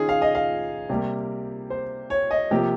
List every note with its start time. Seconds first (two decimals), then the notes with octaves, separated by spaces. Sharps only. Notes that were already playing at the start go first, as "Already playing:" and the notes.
Already playing: D#3 C#4 D#4 F4 G#4
0.09 F5
0.22 D#5
0.35 F5
0.90 C3 G3 A#3 G4
1.70 C5
2.10 C#5
2.31 D#5
2.51 C3 F3 A#3 G4